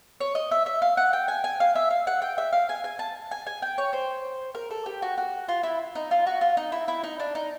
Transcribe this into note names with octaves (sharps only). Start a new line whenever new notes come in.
C#5
D#5
E5
E5
F5
F#5
G5
G#5
G#5
F5
E5
F5
F#5
G5
E5
F5
G#5
G#5
A5
G#5
G#5
G5
C#5
C5
A#4
A4
G4
F#4
F#4
F4
E4
D#4
F4
F#4
F4
D#4
E4
E4
D#4
D4
D#4